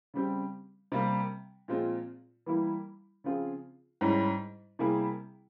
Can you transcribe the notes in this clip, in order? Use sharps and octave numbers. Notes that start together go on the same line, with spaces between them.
C#3 G3 C4 G4
C3 G3 A#3
A#2 F3 G#3 C4 F4
E3 G3 A#3 E4
C#3 F3 C4 F4 G#4
G#2 G3 C#4 E4
C3 G3 A#3 E4 G#4